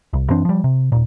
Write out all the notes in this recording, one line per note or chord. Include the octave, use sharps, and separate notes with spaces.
C2
F#2 E3 C4 D4
F3 G3
C3
D#1 A#2